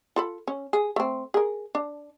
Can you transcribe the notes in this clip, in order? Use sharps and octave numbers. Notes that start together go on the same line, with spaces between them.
F4 A4 B5
C#4
G#4
A3 C4
G#4 A#4
D4